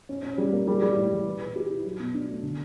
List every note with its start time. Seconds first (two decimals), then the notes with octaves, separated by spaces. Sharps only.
0.09 C#4
0.23 C#4
0.38 G3
0.53 A#3
0.67 G3
0.82 G3
0.96 A2
1.12 E3
1.26 B4
1.41 B4
1.56 G4
1.70 E4
1.84 F#3
2.00 B2
2.14 D4
2.28 A3
2.43 D3